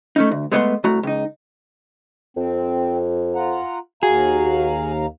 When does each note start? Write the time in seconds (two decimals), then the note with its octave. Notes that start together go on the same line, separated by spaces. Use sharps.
0.16 A3 C#4 D#4
0.31 D2
0.52 G#3 A3 B3 C#4 F#5 C6
0.84 C2 A3 F#4 A#5
1.03 C#2 D#4
2.37 F2 C4
3.35 F4 F#5 A#5
4.03 D#2 F#4 G#4 F5 A#5